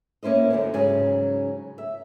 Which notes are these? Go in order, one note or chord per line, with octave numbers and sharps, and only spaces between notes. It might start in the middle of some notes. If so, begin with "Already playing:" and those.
A#3 C#4 E4 C5 D#5
F#2 D3 F#3 D#4
G#2 C#3 F#3 C#4 G#4
E5